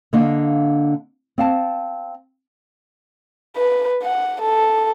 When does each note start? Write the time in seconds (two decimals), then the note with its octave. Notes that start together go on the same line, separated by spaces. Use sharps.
0.13 D3 A#3 D4 D#5 F5
1.38 C4 F5 A5
3.57 B4
4.03 F#5
4.42 A4